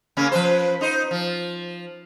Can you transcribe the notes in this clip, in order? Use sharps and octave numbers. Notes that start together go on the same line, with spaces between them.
C#3 A#3 C#4
F3 B4 C5
D#4 C5
F3